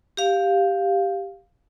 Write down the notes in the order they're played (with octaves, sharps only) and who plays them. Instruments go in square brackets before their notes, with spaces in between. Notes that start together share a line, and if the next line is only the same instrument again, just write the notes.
[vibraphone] G4 F5